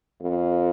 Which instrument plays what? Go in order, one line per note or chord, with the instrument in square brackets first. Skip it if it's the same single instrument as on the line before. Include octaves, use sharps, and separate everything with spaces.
[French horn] F2